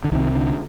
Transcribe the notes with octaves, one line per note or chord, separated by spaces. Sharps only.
D3
C2 C3 D#3
D3